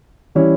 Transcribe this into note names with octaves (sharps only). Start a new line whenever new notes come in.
E3 G3 C#4 E4